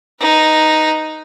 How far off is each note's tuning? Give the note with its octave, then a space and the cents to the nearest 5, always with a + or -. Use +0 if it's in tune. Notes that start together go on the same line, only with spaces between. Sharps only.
D#4 +0 B4 +0